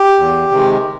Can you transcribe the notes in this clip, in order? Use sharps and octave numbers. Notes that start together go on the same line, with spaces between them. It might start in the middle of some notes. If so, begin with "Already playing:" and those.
Already playing: G4
E2
C3 D#3 G#3